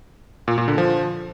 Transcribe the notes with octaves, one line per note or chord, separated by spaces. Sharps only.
A#2
A#2
D3
F3